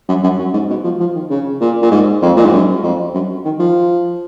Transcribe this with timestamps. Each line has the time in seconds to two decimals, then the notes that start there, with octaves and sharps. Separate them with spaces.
0.09 F#2
0.23 F#2
0.38 F#2
0.53 G#2
0.69 B2
0.84 F3
1.00 F3
1.15 D#3
1.30 C#3
1.61 A#2
1.82 A#2
1.91 G#2
2.22 F2
2.37 A#2
2.45 G#2
2.52 F#2
2.83 F2
3.14 F#2
3.45 D#3
3.59 F3